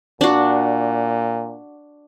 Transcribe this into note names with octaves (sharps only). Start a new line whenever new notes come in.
A#2 D4 F#4